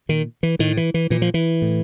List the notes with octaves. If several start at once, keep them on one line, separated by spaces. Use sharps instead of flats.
A#2 D#3
E3
A2 D#3
E3
E3
A#2 E3
F3
E3
A2